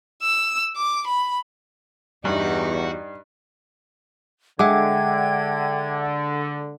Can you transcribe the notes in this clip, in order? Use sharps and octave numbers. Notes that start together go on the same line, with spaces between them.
E6
D6
B5
E2 G2 D#4 F#4 G4
D3 G#3 E5 F#5 G5 D6 G#6